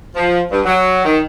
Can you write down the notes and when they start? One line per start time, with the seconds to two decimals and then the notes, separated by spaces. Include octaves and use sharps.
0.15 F3
0.50 G2
0.65 F#3
1.05 D#3